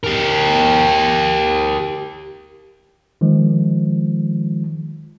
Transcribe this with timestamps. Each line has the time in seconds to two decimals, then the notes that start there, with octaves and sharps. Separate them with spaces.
0.03 G4 A#4
3.21 D#3 F3 G#3